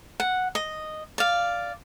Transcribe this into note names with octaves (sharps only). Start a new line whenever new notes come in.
F#5
D#5
D5 F5